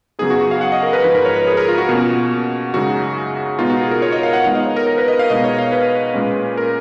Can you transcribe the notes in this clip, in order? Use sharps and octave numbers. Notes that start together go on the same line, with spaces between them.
F#2 C#3 F#3 B3 D#4 G#4
F#4
F#4
F5
F#5
D#5
A#4
B4
G#2 F3 G#3 D#4 B4
A#4
C#5
B4
G#4
A#4
F4
F#4
B2 A#3 C#4 F#4
F#2 C#3 G#3 D#4 F#4
B2 G#3 B3 D#4 F4
F#4
G#4
A#4
C#5
D#5
F5
F#5
D#3 G#3 B3 D#4 F5
D#5
C#5
A#4
A#4
B4
D#5
F5
B2 G#3 D#4 D#5
C#5
F5
B4
A#2 G#3 C#4
A#4